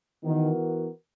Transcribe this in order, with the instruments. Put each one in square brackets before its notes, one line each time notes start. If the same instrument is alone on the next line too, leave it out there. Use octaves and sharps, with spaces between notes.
[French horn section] D#3 [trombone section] E3 B3 F#4 A#4